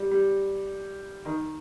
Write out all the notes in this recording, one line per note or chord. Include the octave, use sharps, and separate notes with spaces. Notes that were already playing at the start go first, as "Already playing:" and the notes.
Already playing: G3
G3
D#3